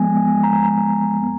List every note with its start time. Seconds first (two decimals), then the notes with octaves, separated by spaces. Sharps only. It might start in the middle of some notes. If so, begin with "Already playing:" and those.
Already playing: F3 G#3 B3 G#5
0.44 A#5
1.23 B3